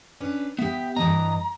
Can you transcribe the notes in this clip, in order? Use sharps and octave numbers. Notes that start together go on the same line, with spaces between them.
C#4 D4 B4
B3 G4 E5
G2 E3 D#5 A#5